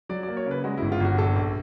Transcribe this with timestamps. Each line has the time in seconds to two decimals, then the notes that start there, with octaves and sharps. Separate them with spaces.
0.09 F#3 D5
0.23 D5
0.28 A#3
0.37 C#5
0.46 C#3 B4
0.64 G#3 F#4
0.77 G1 E4
0.92 F4
1.00 G1 F#4
1.18 A#1 A4
1.36 A#1